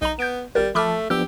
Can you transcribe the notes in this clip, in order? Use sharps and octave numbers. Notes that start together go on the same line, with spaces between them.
B1 D#4 A#5
B3 G6 D7
G#1 G3 A#4
F3 A3 A5 B5 D6 F6
F3 B3 D4 G4 E6